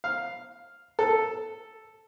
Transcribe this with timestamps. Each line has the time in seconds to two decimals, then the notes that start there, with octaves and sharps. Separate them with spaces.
0.04 F5
0.99 A4